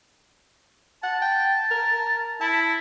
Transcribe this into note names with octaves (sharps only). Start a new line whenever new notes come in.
F#5 A5
G5
A#4
E4 A5